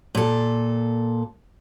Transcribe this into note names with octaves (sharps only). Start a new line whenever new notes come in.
A#2 A4